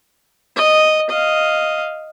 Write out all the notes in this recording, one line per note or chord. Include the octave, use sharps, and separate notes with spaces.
D#5
D#5 F5